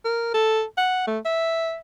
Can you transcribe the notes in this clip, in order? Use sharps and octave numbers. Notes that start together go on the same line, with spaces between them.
A#4
A4
F#5
A3
E5